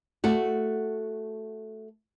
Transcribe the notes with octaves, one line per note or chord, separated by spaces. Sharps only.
A3 F#4